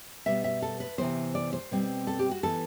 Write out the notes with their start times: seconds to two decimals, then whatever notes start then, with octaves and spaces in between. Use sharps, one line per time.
0.26 B2 G3 B3 E5
0.44 E5
0.62 A4
0.80 B4
0.98 C3 E3 B3 C5
1.35 D5
1.53 C5
1.71 B2 G3 C4
2.07 A4
2.19 G4
2.31 F#4
2.43 E3 B3 A4